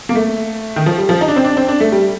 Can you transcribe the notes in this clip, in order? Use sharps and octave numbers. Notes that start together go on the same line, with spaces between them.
A#3
A3
D#3
F3
G3
F3
D#4
D4
C4
D4
C4
D4
A3
G3